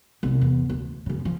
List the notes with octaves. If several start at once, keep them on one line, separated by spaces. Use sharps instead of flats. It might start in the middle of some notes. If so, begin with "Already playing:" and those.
C2
E2
D2
F#2 C#3
F3